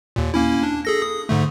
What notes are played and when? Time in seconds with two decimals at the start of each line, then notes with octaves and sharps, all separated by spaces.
0.16 D#2 A#2
0.34 A#3 C#4 E4
0.63 D4
0.85 G#4 A4 A#6
1.02 D#6
1.29 G#2 D3 A3